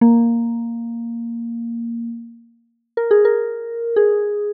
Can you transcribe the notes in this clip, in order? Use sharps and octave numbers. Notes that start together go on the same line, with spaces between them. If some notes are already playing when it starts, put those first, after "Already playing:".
A#3
A#4
G#4
A#4
G#4